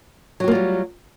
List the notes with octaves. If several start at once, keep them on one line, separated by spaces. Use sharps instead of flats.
F#3 G3 A#3 F4 F#4